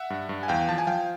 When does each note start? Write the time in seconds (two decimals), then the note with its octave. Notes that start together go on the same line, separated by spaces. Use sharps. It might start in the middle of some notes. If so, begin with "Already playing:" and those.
Already playing: E5 F#5
0.10 G2
0.29 G2
0.43 G#5
0.48 E2 F5 G5
0.68 F3 A5
0.78 G#5
0.87 F3 F5 G5